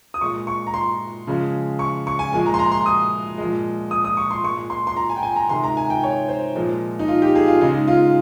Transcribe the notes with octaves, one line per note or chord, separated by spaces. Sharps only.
D#6
A#2 G#3 C#6
C#6
A#5
C6
C#3 F3 G#3
C#6
C#6
G#5
A#2 F3 G#3 G#5
A#5
C6
A#5
C6
D#6
A#2 F3 G#3
D#6
D#6
C#6
C6
A#2 G#3 C#6
C6
C6
A#5
G#5
G5
G#5
A#5
C3 D#3 G#3 C6
A#5
G#5
G5
C#5
C5
A#2 F3 G#3
D#4
F4
G4
G#4
F4
C#3 G#3 D#4
F4